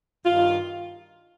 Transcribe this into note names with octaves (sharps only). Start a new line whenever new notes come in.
G2 D#3 F4